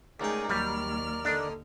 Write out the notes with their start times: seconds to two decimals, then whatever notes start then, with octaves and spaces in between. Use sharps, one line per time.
0.20 C#2 A3 D#4 G#4 A#4 D5 G5
0.50 D#2 F#3 G3 F6
1.25 D3 A#3 D4 D#4